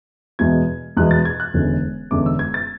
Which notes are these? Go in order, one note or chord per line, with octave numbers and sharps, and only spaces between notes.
E2 B2 G#3 G#6
E2 B2 G#3 F#6
A6
G#6
F#6
E1 E2 D3 G#3 C#4
E1 E2 D3 G#3 C#4 D6
E6
G#6
A6